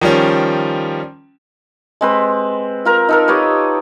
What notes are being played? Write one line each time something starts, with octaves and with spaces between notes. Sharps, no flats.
D#3 F3 G3 C#4
G#3 C4 B4
F4 A#4 A#5
D#4 A4 A#4
G4 B4 C#5 D#5